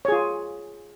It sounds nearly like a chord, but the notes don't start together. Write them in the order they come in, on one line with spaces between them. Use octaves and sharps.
C#5 G#4 F4